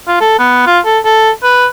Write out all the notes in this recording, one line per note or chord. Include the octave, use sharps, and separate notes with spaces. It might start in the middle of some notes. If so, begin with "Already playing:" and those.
F4
A4
B3
F4
A4
A4
B4